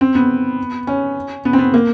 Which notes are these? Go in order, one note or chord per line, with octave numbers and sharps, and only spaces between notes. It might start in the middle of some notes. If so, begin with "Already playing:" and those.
C4
B3
C#4
B3
C4
B3
A#3